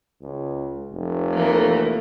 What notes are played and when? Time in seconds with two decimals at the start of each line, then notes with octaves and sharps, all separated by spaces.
0.22 C#2
0.92 F1
1.34 E3 A3 A#3